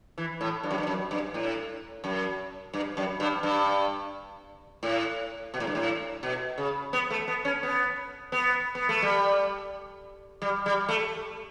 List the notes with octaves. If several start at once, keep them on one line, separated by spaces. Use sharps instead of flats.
E3
A2
G2
F#2
G2
F#2
G2
A2
F#2
G2
F#2
G2
G2
A2
B2
A2
G2
A2
B2
C#3
B3
A3
B3
C#4
B3
B3
B3
A3
G3
G3
G3
A3